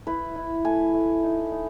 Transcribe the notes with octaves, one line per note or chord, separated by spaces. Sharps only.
E4 B4
E4
A3 G#5
A3
D#4
D#4